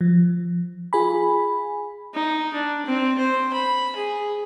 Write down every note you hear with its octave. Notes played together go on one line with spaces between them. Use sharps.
F3
F4 G#4 G#5 B5
D#4
D4
C4
C5
B5
G#4